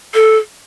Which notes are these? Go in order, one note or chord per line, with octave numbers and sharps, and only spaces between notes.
A4